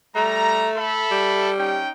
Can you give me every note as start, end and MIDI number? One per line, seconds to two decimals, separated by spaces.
0.15 0.67 55
0.15 1.02 57
0.15 0.67 82
0.77 1.50 69
0.77 1.50 76
0.77 1.50 83
1.11 1.79 55
1.58 1.90 61
1.58 1.90 63
1.58 1.90 79